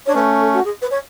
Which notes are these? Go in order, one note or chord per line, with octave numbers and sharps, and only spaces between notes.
D4 C#5
A3 C#4 B4
A4
F#4
G#4
B4
C#5